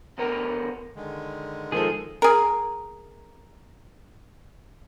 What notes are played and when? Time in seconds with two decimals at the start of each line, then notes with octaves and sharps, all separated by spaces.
0.18 E2 D3 B3 A#4 A#5
0.96 D3 D#3 G#3
1.72 D#3 F3 G#3 G#4 A4
2.22 G#4 A#4